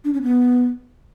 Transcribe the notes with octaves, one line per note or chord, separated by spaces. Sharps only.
D4
C#4
B3